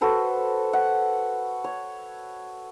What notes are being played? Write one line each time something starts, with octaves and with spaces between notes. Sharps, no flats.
F#4 A4 B4 C5
F#5
C#5